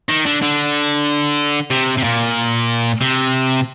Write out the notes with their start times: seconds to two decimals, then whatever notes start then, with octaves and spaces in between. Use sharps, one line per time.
0.09 D#3
0.26 D3
0.42 D3
1.71 C3
1.97 C3
2.03 A#2
3.01 C3